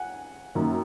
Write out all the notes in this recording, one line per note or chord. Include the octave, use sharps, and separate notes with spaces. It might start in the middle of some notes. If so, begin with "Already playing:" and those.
Already playing: F#5 G#5
F#2 D#3 A#3